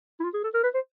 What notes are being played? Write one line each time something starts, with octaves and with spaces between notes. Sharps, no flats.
E4
F4
G#4
A4
A#4
B4
C5